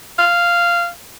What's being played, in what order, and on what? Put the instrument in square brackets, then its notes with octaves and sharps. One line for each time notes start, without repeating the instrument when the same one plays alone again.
[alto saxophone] F5